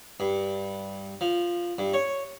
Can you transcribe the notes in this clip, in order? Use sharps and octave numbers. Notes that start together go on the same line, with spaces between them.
G2
F3
G2
C#5